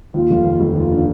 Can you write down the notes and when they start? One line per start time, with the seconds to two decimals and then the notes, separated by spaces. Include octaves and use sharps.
0.14 D#2 F4
0.30 F1
0.45 D#2
0.60 F1
0.76 D#2 F4
0.92 D3